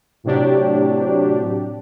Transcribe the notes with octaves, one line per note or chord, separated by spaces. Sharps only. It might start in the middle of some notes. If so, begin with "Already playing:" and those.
A2 C3 F#3 D4 G4